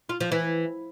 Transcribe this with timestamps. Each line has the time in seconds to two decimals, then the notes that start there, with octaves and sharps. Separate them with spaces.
0.09 F4
0.20 F3
0.32 E3